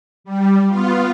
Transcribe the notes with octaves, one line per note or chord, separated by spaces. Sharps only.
G3
B3 F4